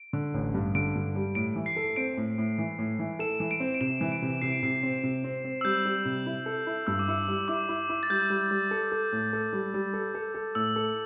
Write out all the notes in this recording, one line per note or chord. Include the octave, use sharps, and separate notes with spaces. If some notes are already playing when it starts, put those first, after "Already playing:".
Already playing: D7
D3
A1
G2
D3 D7
G2
G3
A2 D7
E3
C7
A4
C4 D7
A2
A2
E3
A2
E3
A4 E7
E3
D7
C4
D7
C3 E7
E3
D7
C3
C3 C7
D7
C3 C7
C4
C3
C4
C4
E6
G3 G6
G3
C3
E4
A4
E4
G2 E6
D6
E4 E6
G3
E4 D6
E4
E4
A6
G3 G6
G3
G3
A4
A4
A2
A4
G3
G3
A4
A4
A4
A2 E6
A4